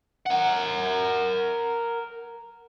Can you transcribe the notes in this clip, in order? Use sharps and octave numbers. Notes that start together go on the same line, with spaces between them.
A#4 F#5